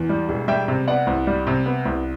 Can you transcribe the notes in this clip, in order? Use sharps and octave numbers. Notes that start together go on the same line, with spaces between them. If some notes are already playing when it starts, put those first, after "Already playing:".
Already playing: E2
G3
E1
G3 E5 G5
C3
B3 D5 F#5
C2
G3
C3
B3
C2